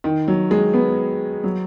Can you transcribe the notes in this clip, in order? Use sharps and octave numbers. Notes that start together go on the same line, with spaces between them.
D#3
F#3
G#3
B3
F#3